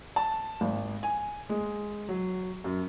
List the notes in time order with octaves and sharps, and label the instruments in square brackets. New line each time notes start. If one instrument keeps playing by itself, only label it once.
[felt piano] A5
G#1
G#5
G#3
F#3
F#2